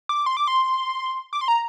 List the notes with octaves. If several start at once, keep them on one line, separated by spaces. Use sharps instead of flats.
D6
C6
D6
C6
D6
C6
A#5